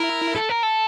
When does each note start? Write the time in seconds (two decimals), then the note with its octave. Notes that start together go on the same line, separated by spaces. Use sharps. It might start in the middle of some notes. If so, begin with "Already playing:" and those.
Already playing: E4 A#4
0.36 A4
0.49 A#4
0.63 A4